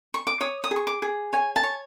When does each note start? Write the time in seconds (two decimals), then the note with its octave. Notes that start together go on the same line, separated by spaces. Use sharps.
0.14 C#6
0.27 D6
0.41 C#5 D#6
0.64 D#6
0.71 G#4
0.76 C#6
0.87 D6
1.02 G#4
1.33 C#5 G#5
1.56 A5
1.63 C#5